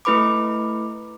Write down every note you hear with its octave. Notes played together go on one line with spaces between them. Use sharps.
A3 E4 B4 B5 D6